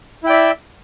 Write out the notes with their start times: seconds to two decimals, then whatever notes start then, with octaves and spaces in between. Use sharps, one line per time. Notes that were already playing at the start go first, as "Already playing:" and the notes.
0.24 E4
0.27 G5
0.29 D5
0.32 E5